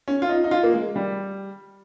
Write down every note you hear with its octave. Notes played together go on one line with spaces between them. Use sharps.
C#4
F4
D#4
D#4
F4
A#3
G#3
G3